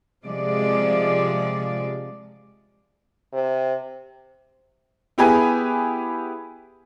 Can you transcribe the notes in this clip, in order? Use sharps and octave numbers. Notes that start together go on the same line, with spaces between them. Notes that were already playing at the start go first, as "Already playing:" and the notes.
C3 F3 G#3 D5
C3
B3 E4 G4 G#4 B4 G#5